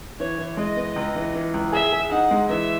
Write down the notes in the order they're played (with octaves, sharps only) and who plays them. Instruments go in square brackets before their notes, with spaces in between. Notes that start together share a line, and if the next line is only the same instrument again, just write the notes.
[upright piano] E3 [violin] C#5
[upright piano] E3
[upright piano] G#3 [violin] D#5
[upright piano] B3
C#2
E3
E3
C#2
[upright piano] G#4 [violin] E5
[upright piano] G#4
[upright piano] D#4 [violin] F#5
[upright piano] G#3
[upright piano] E3 [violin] E5